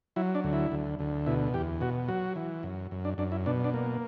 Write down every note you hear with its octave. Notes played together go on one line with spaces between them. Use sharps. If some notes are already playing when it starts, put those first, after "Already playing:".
F#3 E4
D4
D2
E4
D2
D2
B2 E4
E2 G4
B2 F#4
F#3 F#4
E3
F#2
F#2
D4
F#2 D4
E4
B2 D4
D4
A#3